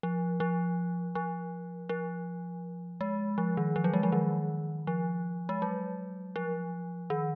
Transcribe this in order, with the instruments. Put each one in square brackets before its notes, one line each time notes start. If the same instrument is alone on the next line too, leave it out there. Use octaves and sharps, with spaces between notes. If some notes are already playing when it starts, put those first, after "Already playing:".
[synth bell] F3
F3
F3
F3
G#3
F3
D#3
F3
F#3
G#3
F3
D#3
F3
G#3
F#3
F3
D#3